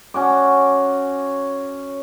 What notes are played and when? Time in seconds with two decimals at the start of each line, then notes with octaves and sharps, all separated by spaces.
0.14 C#4 F#4 D6